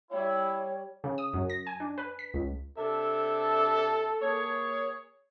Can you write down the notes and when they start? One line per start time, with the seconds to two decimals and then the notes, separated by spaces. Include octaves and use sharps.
0.11 G3 E4 C#5
1.04 C#3
1.18 D#6
1.33 F#2
1.50 A#6
1.67 G#5
1.80 D4
1.98 B4
2.19 B6
2.34 C#2
2.78 C3 D4 A4 E5
4.22 A#3 G#4 C#5